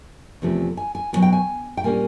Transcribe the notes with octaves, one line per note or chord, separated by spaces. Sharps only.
E2 C3 F3 A3 C#4
G#5
G#5
E2 B2 F#3 G#5
G5
G#5
G5
A#2 G3 A#3 C#4 G#5